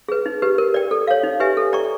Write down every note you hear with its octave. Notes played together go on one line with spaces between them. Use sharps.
G#4 B4
D#4
G4 B4
A#4
D5 G5
A4
C#5 F5
D#4
G4 B4 E5 G#5
A4
D5 G5 A#5 C#6